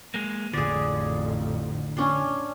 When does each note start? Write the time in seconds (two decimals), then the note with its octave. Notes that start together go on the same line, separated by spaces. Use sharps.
0.14 G#3 A#3
0.53 A1 F2 D3 G#4 D5
1.97 C#4 D4 C6